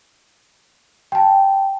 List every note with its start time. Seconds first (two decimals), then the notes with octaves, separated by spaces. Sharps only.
1.12 G5 A5